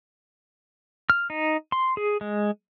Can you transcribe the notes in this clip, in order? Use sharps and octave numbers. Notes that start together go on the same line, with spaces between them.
F6
D#4
C6
G#4
G#3